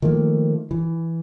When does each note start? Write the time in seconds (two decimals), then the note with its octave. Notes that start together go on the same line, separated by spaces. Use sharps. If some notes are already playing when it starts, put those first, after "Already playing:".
0.02 D#3 F3 A3 A#3
0.71 E3